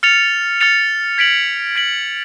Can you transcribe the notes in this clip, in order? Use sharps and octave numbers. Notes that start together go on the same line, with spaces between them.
F6 A6 C#7 F7
F6 A6 C#7 F7
G#6 B6 D7 F#7
G#6 B6 D7 F#7